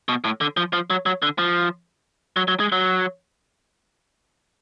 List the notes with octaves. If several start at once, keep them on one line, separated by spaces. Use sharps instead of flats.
B2
A2
D3
F3
F3
F#3
F#3
D3
F3
F#3
F#3
G#3
F#3